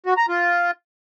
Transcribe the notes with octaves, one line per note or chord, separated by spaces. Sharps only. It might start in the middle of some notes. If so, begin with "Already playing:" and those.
F#4
A#5
F4